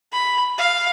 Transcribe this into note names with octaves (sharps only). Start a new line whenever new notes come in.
B5
F5